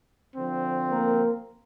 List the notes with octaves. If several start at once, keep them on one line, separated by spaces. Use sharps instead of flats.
D3 F3 C4
A#3 A#4